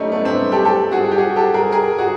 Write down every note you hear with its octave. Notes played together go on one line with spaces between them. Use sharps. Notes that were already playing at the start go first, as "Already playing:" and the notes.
Already playing: G3 A3 C#4 D#4 E4
A3 B3
C4 D4
G4 A4
G4 A4
F#4 G#4
F#4
G4
F#4 G#4
G4 A4
G#4 A#4
G#4 A#4
F#4 G#4